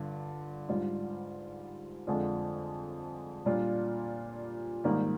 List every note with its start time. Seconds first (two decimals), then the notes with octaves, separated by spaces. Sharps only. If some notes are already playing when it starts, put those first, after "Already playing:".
Already playing: G2 D3 F4
0.69 G#2 G3 D4 F4
2.07 F2 D3 G#3 D4 F4
3.46 A#2 G3 D4 F4
4.84 G#2 D#3 G3 A#3